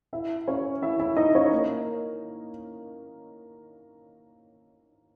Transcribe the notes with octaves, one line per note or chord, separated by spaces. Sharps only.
E4 E5
C#4 C#5
E4 E5
E4 E5
D#4 D#5
C#4 C#5
A#3 A#4